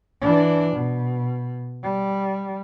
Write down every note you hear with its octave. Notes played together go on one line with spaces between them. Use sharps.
E3 D4
B2
G3